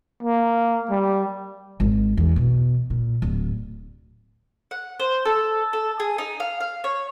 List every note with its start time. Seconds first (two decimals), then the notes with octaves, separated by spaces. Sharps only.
0.23 A#3
0.90 G3
1.80 G#1
2.17 E2
2.36 B2
2.90 A#2
3.22 D1
4.71 F#5
4.99 C5
5.25 A4
5.73 A4
6.00 G#4
6.18 D#4
6.40 F5
6.60 F5
6.84 C#5